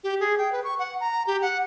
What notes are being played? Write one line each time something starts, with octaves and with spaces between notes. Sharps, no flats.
G4
G#4
G5
B4
C#6
F#5
A#5
G4
F#5